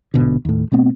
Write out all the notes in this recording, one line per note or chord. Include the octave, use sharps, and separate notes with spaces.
A#1 G#2 B2 D3
D#2 A2
B2 A3 B3 C4